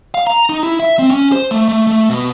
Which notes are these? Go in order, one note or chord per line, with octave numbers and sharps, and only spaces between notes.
F5
A#5
D#4
E4
E5
C4
C#4
C5
A3
A3
A3
B2